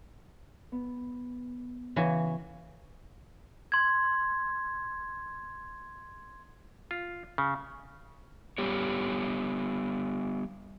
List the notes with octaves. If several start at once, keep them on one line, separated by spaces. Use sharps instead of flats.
B3
C#3 E3 F#4
C6 G#6
F4
C#3
G3 B3 G4 C#5